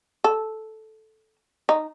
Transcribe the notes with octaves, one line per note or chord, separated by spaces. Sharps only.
A4
D#4